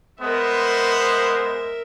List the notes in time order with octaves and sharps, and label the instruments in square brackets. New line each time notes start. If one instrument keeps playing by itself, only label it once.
[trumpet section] G#3 B3 C5 [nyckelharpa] A#4 E5